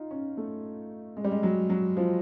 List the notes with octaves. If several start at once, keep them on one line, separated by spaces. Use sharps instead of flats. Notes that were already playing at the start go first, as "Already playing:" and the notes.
Already playing: D#4 F4
C#4
A3
G#3
G3
G#3
F#3
F#3
F3